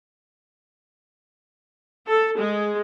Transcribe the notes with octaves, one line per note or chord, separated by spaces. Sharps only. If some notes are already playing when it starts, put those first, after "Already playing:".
A4
G#3